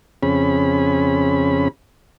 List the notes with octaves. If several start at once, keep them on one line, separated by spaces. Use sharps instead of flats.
F2 C#3 C4 C#4 G#4 B5